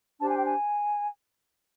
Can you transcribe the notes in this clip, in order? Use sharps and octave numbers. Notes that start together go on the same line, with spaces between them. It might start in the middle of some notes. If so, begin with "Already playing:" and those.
D4 G4 C5 A5
G#5
G5
G#5